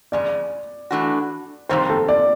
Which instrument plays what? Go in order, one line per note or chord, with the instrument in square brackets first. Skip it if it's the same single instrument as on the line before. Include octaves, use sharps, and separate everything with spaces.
[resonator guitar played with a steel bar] F2 C#3 G#3 [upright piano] D5
[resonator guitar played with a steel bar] E3 A3 D4 F#4
[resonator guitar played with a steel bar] F2 C3 D#3 G3 C4 [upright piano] C5
[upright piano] A4
D5